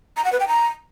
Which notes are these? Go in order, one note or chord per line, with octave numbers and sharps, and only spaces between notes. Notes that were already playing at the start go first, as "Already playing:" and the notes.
A#5
F#5
B4
G5
A#5